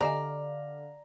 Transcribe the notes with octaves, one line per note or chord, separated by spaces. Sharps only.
D3 G4 D5 D#5 F5 G#5 A#5